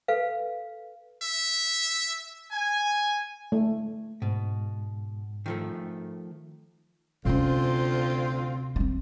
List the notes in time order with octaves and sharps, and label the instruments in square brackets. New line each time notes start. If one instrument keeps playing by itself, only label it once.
[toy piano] A4 B4 F5
[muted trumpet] E5
[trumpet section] G#5
[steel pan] A3
[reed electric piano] G#2 [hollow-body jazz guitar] B2
[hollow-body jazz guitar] D#3 F3 A3
[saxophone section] D2 C4 F4 [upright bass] C3 C#4
[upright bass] B3 C4